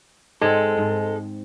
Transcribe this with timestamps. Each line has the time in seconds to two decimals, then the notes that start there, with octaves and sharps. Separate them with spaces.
0.41 G#2 G#3 C4 A4
0.78 G#2